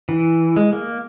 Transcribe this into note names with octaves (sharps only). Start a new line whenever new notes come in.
E3
G#3
A#3